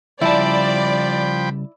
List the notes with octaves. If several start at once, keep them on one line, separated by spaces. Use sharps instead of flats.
C#3 F3 G3 E4 D5 G5 A5 B5